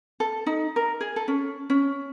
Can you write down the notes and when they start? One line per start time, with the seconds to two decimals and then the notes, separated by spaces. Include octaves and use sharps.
0.20 A4
0.46 D#4
0.76 A#4
1.01 G#4
1.16 A4
1.28 C#4
1.70 C#4